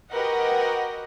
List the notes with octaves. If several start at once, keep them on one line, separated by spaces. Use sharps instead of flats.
F#4 G4 A#4 B4 D#5 F#5